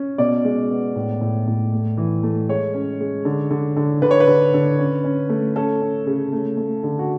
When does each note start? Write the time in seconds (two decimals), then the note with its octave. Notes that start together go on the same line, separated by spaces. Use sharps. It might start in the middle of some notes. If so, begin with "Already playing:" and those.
Already playing: C#4
0.18 B2 D5
0.45 G#3
0.71 B3
0.96 A2
1.21 A2
1.47 A2
1.72 A3
1.97 E3
2.23 A3
2.49 G#3 C#5
2.74 C#4
3.01 G#3
3.25 D3
3.51 D3
3.77 D3
4.02 D3 B4
4.11 C#5
4.20 B4
4.27 D3
4.54 D3
4.79 C#4
5.04 C#4
5.29 A3
5.56 C#4 A4
5.82 C#4
6.06 C#3
6.33 A3
6.57 A3
6.83 D3
6.99 F#4